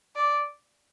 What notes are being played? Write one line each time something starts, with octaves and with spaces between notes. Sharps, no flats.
D5